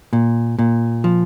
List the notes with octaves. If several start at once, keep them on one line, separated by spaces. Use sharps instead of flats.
A#2
A#2
F3